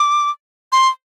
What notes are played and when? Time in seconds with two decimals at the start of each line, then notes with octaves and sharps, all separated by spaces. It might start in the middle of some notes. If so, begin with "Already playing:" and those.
Already playing: D6
0.72 C6